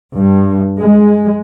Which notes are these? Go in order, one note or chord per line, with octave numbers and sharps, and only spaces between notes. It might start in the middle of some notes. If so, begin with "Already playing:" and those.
G2
G#3